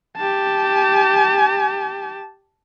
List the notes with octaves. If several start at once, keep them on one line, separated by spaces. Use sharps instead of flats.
G4 A5